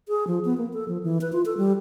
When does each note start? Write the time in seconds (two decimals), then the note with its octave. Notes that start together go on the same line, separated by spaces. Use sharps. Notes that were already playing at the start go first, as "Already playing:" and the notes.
0.09 G#4
0.27 F3
0.45 B3
0.58 A#3
0.73 A4
0.88 F3
1.03 E3
1.21 B4
1.32 F4
1.45 A4
1.58 G3